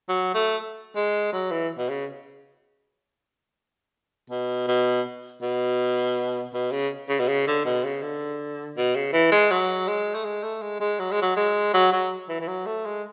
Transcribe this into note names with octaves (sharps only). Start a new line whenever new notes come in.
F#3
A3
G#3
F#3
E3
B2
C#3
B2
B2
B2
B2
C#3
C#3
B2
C#3
D3
B2
C#3
D3
B2
C#3
E3
G#3
F#3
G#3
A3
G#3
A3
G#3
G#3
F#3
G#3
F#3
G#3
F#3
F#3
E3
E3
F#3
A3
G#3